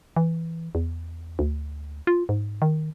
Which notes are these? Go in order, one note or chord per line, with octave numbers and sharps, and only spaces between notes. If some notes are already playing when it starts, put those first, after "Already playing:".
E3
E2
D2
F4
G#2
D#3